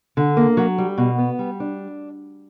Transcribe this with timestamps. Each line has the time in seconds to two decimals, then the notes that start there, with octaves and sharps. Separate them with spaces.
0.17 D3
0.37 A#3
0.57 F#3
0.78 G3
0.98 B2
1.18 B3
1.39 G3
1.60 D4